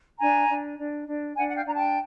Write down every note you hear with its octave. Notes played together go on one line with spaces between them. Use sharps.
D4 G#5 A#5
D4
D4
D4
D4 F#5 G#5
F#5
F5 G5
D4 A#5
G5 A5